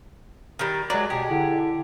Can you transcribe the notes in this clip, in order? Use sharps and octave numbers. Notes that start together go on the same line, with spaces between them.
D#3 G3
F#3 G#3 D5
B2 G4 G#4
D3 E4